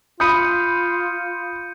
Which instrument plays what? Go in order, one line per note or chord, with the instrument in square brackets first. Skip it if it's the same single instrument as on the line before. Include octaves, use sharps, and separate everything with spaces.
[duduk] F4 [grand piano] B5 D#6 [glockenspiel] G6 C#7 D#7